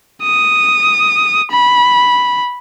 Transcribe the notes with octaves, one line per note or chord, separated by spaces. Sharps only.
D#6
B5